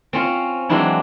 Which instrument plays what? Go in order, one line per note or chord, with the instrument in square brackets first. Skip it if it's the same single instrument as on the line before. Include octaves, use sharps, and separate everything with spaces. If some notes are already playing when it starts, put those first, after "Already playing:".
[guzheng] C4 C#4 F4
E3 F#3 G#3 C4 D4 E4